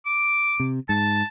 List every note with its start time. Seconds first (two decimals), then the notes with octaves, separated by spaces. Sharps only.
0.06 D6
0.60 C3
0.89 G#2 A5